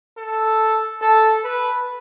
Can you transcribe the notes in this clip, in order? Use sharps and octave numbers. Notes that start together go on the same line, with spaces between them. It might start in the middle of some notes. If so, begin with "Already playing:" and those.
A4
A4
B4